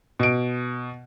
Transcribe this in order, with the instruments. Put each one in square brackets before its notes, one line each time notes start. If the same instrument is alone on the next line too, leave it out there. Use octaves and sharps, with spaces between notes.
[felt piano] B2 D7